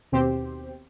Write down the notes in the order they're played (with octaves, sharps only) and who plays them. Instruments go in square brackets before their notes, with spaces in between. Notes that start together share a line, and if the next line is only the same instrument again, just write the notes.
[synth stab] D#2 B2 C4 G4 C5